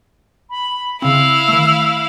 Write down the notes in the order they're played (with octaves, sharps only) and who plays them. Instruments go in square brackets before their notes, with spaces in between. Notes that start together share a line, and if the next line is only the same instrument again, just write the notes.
[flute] B5
[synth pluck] C#3 C4 [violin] E4 F5 [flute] E6
[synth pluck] D#3 A3